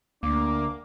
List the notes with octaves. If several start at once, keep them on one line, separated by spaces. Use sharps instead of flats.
D2 A#3 D4 D6